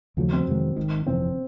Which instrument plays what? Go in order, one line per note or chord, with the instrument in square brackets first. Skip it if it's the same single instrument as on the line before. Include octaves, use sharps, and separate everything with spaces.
[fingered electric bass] D#2 C#3 F3 A3 [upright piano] F#3
[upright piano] C4
[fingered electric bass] F2 C3 D#3 G#3
G#1 G#2 D#3
[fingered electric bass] G1 F2 C3 E3 [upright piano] C4